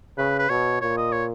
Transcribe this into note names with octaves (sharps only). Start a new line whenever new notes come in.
C#3 B4
B4
B2 C#5
A#2 C#5
D#5
C#5